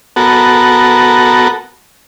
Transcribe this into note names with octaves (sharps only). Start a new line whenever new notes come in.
B3 F#4 A4 A#4